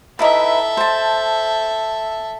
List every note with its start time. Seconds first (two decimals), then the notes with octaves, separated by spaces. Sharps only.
0.19 D#4 E4 A4 B4 E5
0.77 C5 A5